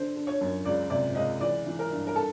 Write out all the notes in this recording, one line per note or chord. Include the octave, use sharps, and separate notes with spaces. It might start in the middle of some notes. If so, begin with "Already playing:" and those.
Already playing: D3 C5
D3
C#5
F#2
C#2 D5
C3 D5
C#2 D#5
E3 D5
E3
A#4
G2
A#4
A4